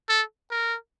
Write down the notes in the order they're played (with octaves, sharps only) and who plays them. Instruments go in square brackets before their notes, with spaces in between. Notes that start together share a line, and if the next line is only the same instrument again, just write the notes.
[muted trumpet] A4
A#4